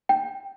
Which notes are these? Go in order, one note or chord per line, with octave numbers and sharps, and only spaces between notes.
G5